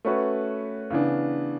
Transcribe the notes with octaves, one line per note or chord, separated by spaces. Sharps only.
A3 C#4 F#4 B4
C#3 E3 B3 D4